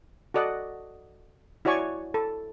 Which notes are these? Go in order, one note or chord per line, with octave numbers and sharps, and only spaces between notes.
F#4 A4 D5 D#5 F#5
E4 F#4 C#5 D5 G#5 C#6
A4